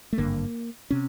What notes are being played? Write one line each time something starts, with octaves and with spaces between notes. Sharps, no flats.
A3
G#1 G2 D3 A#3
C3 C#4